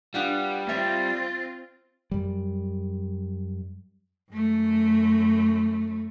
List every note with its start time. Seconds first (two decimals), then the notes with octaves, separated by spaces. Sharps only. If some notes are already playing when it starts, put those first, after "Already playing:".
0.14 G3 B3 D4 F4 F#5
0.69 C4 F4 C#5 E5 G5 A6
2.11 F#2 G3
4.31 F#2 A3